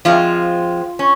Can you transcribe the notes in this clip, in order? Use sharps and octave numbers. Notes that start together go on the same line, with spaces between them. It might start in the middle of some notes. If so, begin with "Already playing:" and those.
F3 G#3 C4 F4
C#4